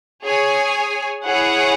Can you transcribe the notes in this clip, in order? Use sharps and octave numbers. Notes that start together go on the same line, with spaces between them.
G#4 C#5 G#5
E4 G#4 C#5 F#5